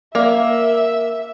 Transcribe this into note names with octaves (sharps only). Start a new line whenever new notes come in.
A#3 D5 E5 F5